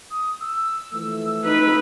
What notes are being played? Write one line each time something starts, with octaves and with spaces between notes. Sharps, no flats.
D#6
E6
E3 F3 A3
D#4 B4